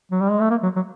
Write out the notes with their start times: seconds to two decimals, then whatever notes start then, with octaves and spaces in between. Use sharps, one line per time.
0.11 F#3
0.21 G3
0.31 G#3
0.40 A3
0.50 A#3
0.63 F#3
0.76 F#3